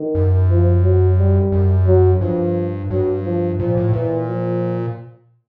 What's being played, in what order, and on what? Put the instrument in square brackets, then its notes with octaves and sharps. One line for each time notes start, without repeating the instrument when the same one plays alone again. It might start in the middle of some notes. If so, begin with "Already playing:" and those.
Already playing: [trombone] D#3
[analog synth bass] F#2
[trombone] F3
F#3
G3
[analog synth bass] F#2
[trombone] F#3
[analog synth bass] G2 [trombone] F3
[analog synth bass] G2 [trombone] F#3
[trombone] F3
[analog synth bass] A#2 [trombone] F3
[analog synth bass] A2
[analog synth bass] A#2 [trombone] E3
[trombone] F3